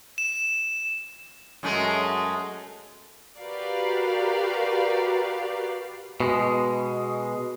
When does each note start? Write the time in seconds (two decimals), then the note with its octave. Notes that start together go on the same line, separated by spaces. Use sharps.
0.18 E7
1.63 F#2 G#3 A3
3.40 F#4 G4 A#4 B4 D5 F5
6.20 B2 G#3